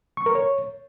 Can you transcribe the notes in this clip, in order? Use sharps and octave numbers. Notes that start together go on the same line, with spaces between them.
C#6
A#4
C#5